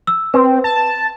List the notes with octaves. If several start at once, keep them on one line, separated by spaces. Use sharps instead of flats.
E6
C4 B4
A5